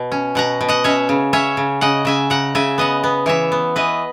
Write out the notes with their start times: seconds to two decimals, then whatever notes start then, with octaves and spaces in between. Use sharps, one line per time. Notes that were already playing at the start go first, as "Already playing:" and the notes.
Already playing: B2
0.12 C#4
0.35 B2 F#5 A#5
0.61 B2
0.69 D#5 F#5
0.84 C#4 C#5 E5
1.09 C#3
1.33 C#4 C#5 E5
1.57 C#3
1.81 C#3 D#5 F#5
2.05 C#3 E5 G#5
2.30 C#3 F#5 A#5
2.55 C#3 E5 G#5
2.78 B3 D#5 F#5
3.04 B3
3.26 E3 C#5 E5
3.52 B3
3.76 E3 B4 D#5